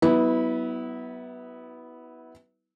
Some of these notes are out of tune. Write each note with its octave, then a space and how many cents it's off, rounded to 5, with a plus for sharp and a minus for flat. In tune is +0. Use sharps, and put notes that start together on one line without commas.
F#3 +35 B3 +0 E4 -25